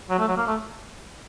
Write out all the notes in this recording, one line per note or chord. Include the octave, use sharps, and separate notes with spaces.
F#3
A3
F#3
A#3
A3